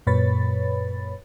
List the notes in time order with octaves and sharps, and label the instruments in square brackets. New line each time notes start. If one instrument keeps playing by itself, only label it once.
[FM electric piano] F#2 A#2 B4 C#5 B5 A6